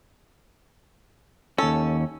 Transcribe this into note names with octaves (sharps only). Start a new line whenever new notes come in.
D#2 C#4 A4